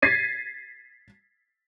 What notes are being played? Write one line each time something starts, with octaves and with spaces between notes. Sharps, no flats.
G#6 A6 B6 C7 D#7